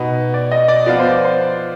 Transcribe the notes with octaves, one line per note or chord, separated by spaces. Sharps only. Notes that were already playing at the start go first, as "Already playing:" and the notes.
Already playing: B2 B3 D#4
D5
D#5
D5
F3 B3 F4 D5
C5
D5
C5